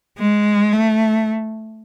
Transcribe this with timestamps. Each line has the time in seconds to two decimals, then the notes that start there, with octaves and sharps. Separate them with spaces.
0.19 G#3
0.72 A3